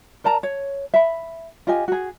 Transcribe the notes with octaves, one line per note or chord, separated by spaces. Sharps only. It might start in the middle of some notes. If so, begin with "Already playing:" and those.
A#4 D5 A5 A#5
C#5
E5 B5
F4 G4 D#5 G#5
F#4 G#4